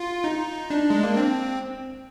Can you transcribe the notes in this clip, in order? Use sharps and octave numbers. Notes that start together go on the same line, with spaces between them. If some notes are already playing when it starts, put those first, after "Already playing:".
Already playing: F4
D#4
D4
G#3
A#3
C4